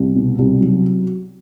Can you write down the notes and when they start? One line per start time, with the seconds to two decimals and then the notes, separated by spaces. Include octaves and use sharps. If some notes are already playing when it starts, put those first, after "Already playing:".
Already playing: C2
0.15 B2
0.39 C2
0.61 F#3